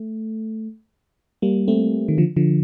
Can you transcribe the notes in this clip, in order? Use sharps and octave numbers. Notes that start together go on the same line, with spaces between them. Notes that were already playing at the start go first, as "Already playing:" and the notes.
Already playing: A3
G3 A#3
A3 C4
D#3
D3 F3
D3 F3